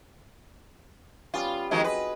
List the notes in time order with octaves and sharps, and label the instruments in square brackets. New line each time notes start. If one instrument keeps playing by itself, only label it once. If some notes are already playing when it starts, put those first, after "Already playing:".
[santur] G3 B3 C#4 [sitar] F4
[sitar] D#3 F3 G#3 [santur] F#3 C4 D#5
[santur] G#4 D#5 D#6 [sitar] B4